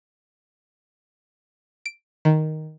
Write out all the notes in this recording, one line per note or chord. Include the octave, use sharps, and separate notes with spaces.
D7
D#3